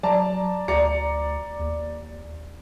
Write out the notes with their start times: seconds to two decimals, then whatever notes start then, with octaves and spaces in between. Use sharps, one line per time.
0.03 F#3 D5 A5 A#5
0.68 D2 D5 A#5 C#7
1.59 D#2